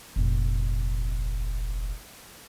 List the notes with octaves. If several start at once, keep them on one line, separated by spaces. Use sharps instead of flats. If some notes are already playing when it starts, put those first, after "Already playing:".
F1 A#1